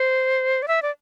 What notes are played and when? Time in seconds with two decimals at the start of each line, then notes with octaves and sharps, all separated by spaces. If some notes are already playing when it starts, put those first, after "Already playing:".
Already playing: C5
0.62 D5
0.68 E5
0.82 D5